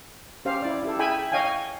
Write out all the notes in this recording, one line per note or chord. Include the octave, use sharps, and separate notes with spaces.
C#4 G4 C5 F5
E4 D5
E4 G4 A4
E4 G#4 E5 G5 G#5 B5
C#5 D#5 F5 G5 G#5